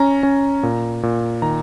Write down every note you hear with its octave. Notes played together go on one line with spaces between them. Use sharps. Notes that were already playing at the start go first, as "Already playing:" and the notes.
Already playing: C#4 A#5
C#4
A#2
A#2
D#3 A#5